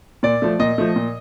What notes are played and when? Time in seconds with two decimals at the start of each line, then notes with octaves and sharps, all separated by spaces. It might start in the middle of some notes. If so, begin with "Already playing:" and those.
0.23 A#2 D5
0.42 F3 A3
0.59 A#2 D#5
0.78 F3 A3
0.96 A#2